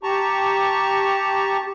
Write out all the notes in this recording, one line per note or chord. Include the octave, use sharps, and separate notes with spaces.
G4 A5 A#5 C#6